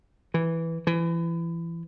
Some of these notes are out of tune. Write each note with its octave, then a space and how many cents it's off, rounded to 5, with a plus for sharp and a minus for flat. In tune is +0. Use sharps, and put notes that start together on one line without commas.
E3 +0
E3 +25